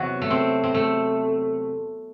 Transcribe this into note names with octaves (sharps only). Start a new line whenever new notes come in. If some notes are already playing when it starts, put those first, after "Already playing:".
Already playing: E2 C3 F#3 F#4
A3
C4
C4
A3